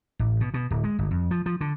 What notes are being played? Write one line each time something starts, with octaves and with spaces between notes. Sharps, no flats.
A1
B2
B2
D1
G#3
G1
F2
F3
F3
D3